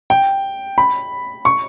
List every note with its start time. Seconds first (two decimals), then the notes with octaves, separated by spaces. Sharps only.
0.10 G5
0.78 B5
1.45 C#6